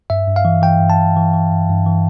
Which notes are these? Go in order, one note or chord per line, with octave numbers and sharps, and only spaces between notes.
G2 E5
G2
F5
E3
E3 G5
G2
A5
G2
E3
E3
G2
G2
E3